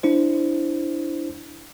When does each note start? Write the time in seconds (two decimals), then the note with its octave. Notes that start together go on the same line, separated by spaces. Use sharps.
0.03 D4 E4 C5